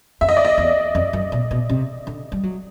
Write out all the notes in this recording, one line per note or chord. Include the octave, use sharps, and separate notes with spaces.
F2 E5
D#5
D5
D#5
E2
F2
F#2
B2
B2
C3
D3
G3
F#3